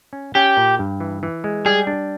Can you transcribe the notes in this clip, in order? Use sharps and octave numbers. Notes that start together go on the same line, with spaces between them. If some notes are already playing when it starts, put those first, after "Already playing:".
C#4
C#4 G4
A#2
G2
E3
E3
G#3
G3 G#4
D4